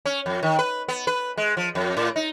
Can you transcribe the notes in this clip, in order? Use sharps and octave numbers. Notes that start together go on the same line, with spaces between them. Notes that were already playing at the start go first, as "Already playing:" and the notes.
C#4
F2
D#3
B4
B3
B4
G#3
F3
F2
A2
D#4